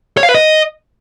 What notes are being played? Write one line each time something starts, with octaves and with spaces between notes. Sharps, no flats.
C#5
F5
B4
D#5